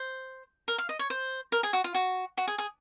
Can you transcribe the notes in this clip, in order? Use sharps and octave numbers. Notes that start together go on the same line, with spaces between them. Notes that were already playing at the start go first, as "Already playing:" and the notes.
Already playing: C5
A#4
F5
D#5
C#5
C5
A#4
G#4
F#4
F4
F#4
F#4
G#4
G#4